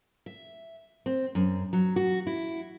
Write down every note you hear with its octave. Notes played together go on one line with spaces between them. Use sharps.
E5
C4
F#2
F#3
F#4
E4